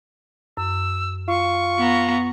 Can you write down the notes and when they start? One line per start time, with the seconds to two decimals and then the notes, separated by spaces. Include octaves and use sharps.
0.57 F#2 E6
1.28 F4 C#6
1.79 B3 A#5